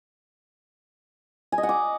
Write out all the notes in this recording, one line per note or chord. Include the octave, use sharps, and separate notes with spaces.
G#5
D#5
F#5
D6